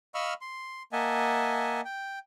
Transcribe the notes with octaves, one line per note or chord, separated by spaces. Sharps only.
D#5 F5 B5 C#6 E6 F6
C6
A#3 D#5 E5 F#5 G#5 A5
G5